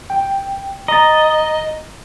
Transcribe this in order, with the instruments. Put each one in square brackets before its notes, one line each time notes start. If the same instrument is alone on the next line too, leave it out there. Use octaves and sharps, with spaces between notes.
[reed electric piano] G5
[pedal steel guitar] D#5 [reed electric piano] A#5 A6